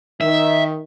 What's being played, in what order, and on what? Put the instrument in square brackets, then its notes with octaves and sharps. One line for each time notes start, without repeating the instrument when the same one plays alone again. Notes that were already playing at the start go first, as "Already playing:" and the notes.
[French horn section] D#3 [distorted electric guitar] E5